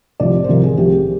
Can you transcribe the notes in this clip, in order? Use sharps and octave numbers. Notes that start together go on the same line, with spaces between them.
C2 C3 F3 D5
C5
C2 C3 F3 A#4
G#4
C2 C3 F3 G4